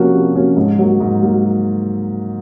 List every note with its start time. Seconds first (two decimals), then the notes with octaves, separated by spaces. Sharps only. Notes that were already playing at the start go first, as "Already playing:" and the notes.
Already playing: C3 F3 A#3 C#4 F#4
0.12 C3
0.34 F3 A#3 C#4 F#4
0.57 G#2
0.79 F#3 A#3
1.00 G#2
1.22 F#3 A#3